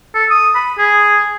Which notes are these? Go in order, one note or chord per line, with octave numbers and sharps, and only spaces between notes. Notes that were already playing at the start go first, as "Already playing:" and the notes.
A4
D#6
B5
G#4